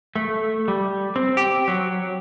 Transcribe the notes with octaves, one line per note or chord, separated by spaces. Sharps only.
A3
G3
C4
G4
F#3